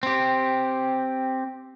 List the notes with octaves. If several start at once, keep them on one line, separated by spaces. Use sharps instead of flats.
C4 G4